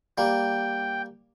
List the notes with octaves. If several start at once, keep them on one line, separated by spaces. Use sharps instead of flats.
G3 A#3 G5